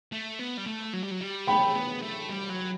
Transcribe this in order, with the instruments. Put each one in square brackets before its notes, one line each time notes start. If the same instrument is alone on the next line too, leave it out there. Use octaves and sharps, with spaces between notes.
[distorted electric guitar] A3
B3
G3
A3
F#3
G3
F#3
G3
[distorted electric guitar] B3 [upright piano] G5 B5
[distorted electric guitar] A3
B3
A3
G3
F#3